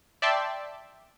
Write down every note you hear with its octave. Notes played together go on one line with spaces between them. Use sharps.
D5 E5 G5 A5 C6